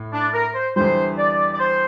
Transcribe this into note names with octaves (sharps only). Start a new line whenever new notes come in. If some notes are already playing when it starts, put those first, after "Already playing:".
Already playing: A2
D4
A#4
C5
E2 D3 G3 C5
D5
D5
C5